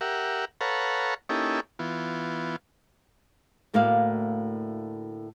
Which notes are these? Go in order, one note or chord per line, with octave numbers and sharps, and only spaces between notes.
G4 A#4 E5 F#5
A4 B4 C#5 F5 F#5 A#5
A#3 C#4 D#4 E4 G4 A4
E3 B3 F4
D2 A2 A#3 F#4 D5 F5